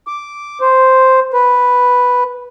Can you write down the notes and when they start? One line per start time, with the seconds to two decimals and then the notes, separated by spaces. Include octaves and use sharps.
0.07 D6
0.61 C5
1.33 B4